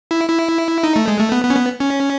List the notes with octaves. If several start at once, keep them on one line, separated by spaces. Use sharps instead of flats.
E4
E4
D#4
A3
G#3
A3
B3
B3
C#4
B3
C#4